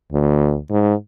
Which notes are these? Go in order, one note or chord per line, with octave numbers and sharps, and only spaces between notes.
D2
G#2